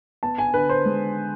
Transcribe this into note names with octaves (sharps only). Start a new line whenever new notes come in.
B3 A5
G#5
D3 B4
C5
G#3